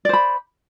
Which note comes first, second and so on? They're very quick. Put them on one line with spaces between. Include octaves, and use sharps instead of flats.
D5 C5 B5